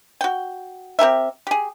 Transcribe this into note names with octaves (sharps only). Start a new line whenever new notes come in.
F#4 G5
C4 G4 A#4 E5
G4 G#4